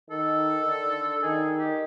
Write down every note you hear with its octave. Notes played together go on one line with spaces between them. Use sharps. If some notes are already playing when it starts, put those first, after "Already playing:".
D#3 A4
D3
A4
D#3 G#4
G4